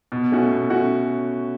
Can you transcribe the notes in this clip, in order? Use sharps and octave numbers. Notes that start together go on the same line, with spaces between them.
B2
A3 C#4 F#4
B2
A3 C#4 F#4